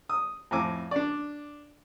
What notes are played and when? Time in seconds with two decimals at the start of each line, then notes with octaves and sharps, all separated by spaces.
0.09 D#6
0.51 F2 A2 G#5 D6
0.91 D4 D5